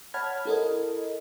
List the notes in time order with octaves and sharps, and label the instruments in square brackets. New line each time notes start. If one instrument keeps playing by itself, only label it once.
[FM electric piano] C#5 F#5 A5 B5 F6 G#6
E4 A4 A#4 D#5